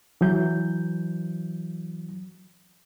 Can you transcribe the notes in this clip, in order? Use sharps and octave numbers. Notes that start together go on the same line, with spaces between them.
E3 F#3 G6